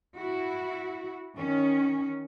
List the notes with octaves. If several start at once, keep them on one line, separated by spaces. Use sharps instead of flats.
E4 F#4
D#3 C#4